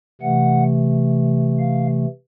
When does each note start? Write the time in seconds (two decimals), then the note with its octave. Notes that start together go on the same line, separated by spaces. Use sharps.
0.21 C3 E3 A3 F#5
1.59 F5